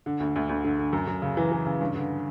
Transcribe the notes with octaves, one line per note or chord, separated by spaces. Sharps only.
D3
D2
D2
D2
D3
D3
F#2
F#2
C#3
E3
E3
C#3
G2
D3